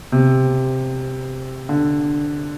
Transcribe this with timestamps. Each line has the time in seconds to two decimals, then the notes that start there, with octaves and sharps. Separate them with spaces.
0.12 C3
1.69 D3